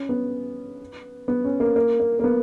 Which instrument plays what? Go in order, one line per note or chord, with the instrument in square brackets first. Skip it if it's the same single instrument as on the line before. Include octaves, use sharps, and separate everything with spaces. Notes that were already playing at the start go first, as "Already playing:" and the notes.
Already playing: [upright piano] C#4
B3
B3
C#4
A#3
A#3
A#3
A#3
B3